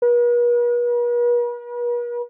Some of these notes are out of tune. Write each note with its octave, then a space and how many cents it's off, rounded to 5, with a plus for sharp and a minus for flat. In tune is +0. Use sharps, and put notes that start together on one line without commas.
B4 -45